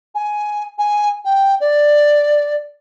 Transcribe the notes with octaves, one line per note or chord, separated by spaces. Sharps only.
G#5
G#5
G5
D5